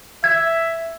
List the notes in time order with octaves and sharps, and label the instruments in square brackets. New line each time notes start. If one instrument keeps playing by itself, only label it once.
[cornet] E5 [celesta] G#6